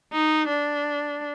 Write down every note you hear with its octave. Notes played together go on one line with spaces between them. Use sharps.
D#4
D4